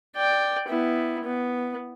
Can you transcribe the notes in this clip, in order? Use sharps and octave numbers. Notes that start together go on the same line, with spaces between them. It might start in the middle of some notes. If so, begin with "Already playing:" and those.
D5 G5
B3 E4
B3